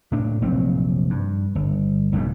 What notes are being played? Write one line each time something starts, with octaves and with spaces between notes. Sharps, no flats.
A2 D4
F1 A#1 F#3 C4
G2
G1
F#1 B1 F2 G#2